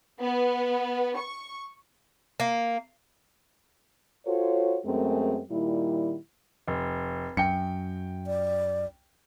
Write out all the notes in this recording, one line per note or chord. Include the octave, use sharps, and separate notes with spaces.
B3
C#6
A#3
F4 F#4 A4 C5 C#5
F#2 G#3 A3 C4 G#4 A#4
A#2 D#3 G3 E4
F1
F#2 G5 C#7
D5